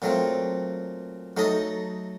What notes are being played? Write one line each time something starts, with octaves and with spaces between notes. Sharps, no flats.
A#2 F#3 A3 C4
F#3 A3 D#4 A4 D#5